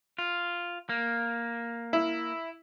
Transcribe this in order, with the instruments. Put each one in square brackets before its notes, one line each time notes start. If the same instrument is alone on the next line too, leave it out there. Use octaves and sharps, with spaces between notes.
[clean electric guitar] F4
A#3
[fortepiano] E4